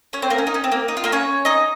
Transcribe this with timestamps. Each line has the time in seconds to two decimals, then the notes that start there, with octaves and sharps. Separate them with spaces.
0.13 C#4 C#5
0.22 C4 C5
0.30 A#3 A#4
0.38 C#4
0.47 D#4
0.54 C#4
0.64 C4
0.72 A#3
0.88 D#4
0.97 F4
1.04 A#3 A#4
1.12 C#4 C#5
1.45 D#4 D#5